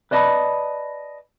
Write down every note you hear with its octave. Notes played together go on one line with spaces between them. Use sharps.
B4 D5 D#5 A5 B5